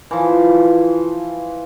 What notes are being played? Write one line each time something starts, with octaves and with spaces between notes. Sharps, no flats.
E3 F3